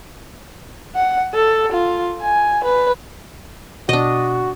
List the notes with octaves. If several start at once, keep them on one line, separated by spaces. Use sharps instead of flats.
F#5
A4
F4
G#5
B4
B2 D4 F#4 D#5